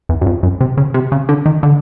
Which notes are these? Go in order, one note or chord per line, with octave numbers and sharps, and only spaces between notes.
E2
F#2
F2
F#2
C3
C#3
C3
C#3
D3
D#3
D3